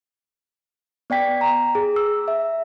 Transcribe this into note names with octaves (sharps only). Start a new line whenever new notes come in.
B3 D5 G5 B6
A#5
G#4
E6
E5